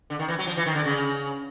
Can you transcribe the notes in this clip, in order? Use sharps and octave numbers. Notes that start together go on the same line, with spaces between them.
D3
D#3
E3
F#3
F3
E3
D#3
D3
C#3